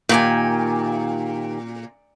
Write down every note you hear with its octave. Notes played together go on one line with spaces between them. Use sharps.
A#2 D#3 G4 G#5